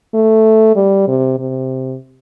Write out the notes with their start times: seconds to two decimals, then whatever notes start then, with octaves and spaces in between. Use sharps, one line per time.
0.14 A3
0.76 G3
1.08 C3
1.39 C3